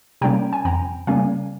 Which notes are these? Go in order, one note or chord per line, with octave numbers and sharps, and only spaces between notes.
C3 G3 A#3 C#4 G5 A#5
G#5
F2 G5 A#5
C#3 G3 A#3 C#4 F5 G#5